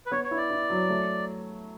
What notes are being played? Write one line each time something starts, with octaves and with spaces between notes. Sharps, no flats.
B4
B3 C#5
C#5
E4
D5
E4
F#3
A3